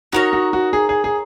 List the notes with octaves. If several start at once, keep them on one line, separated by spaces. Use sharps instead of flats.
D#4 F#4 A#4 C#5
F#4
F#4
G#4
G#4
G#4